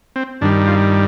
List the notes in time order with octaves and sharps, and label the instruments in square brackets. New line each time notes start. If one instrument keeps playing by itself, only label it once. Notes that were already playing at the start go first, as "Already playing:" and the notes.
[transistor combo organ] C4
G2 D#3 G3 D4
F4